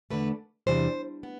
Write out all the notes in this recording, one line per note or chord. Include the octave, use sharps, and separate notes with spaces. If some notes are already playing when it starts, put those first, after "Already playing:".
E2 D3 A3 B4
E2 C3 E3 G3 D4 C5
B3